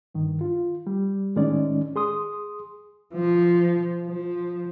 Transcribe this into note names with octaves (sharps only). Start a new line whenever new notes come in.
G2 D#3
F4
G3
A2 D#3 G#3 C#4 D#4 D5
G#4 C6 D#6
F3
F3